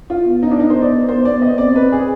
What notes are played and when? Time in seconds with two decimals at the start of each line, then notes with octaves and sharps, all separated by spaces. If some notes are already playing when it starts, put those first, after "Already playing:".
0.10 F4
0.26 B3
0.43 D#4
0.51 D4
0.60 D#4
0.70 C5
0.82 D5
1.09 C5
1.25 D5
1.42 D#5
1.58 C4 D5
1.76 B4
1.92 G#4